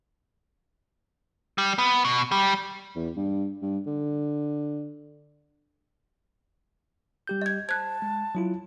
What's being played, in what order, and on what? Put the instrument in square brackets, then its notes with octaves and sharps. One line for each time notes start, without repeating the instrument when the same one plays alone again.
[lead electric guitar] G3
B3
B2
G3
[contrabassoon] E2
G2
G2
D3
[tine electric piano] G3 G4 G6
[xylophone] D#5 G#6
[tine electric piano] C5 [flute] A5 [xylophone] F#6 G#6
[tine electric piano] G#3
F#3 E4 F4